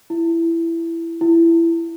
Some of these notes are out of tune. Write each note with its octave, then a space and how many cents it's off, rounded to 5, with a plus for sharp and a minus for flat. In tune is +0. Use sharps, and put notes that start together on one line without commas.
E4 +15
E4 +20